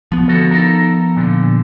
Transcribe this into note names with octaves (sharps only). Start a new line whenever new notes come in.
F3 B3
D3 F#4 A4
D#4 A4 A#4
A#2 D3